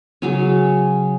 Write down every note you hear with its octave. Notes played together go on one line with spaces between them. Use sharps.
C#3 F#3 C#4